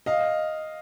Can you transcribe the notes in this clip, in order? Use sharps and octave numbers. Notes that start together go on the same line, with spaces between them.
D#5 F5